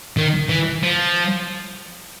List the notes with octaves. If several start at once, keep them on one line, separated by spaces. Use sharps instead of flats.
D#3
E3
F3